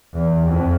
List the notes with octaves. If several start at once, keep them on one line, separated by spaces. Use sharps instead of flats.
E2
F2